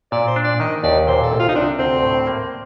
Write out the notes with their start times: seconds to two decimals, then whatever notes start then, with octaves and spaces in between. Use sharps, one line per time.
0.12 A#2 D5
0.28 C5
0.36 D4
0.44 D5
0.60 D#3 D#5
0.83 D#2 D5
1.07 A#2 C5
1.23 A4
1.32 C2
1.40 F4
1.48 D#4
1.55 C3 D4
1.79 D2 C4
2.03 A2
2.27 A#3